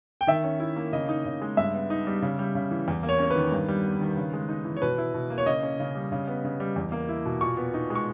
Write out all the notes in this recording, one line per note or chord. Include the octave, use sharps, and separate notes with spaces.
G5
D#3 E5
C#4
E4
A#3
C#3 D#5
D#4
C#3
G#3
G2 E5
B3
D#4
G3
C#3
G3
C#3
E3
E2
A#3
C#5
C#4 C#5
B4
D#3
G2
G3
B3
D#3
C#3
G#3
D#4
E3
C#5
B2 B4
E4
B2
A#3
C#5
C#3 D#5
C#4
C#3
G3
C#3
B3
C#3
G3
E2
A#3
E4
B2
A#2 C#6
B3
D#4
G#3
C#6